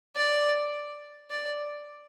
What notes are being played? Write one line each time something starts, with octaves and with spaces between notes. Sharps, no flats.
D5
D5